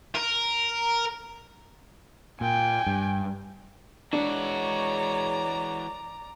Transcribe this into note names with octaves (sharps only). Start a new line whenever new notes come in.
A#4
A#2 G5 G#5
G2
E3 G#3 D4 F#4 C#5 D5 A#5